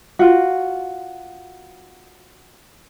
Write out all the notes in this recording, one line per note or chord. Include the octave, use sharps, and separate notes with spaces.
F4 F#4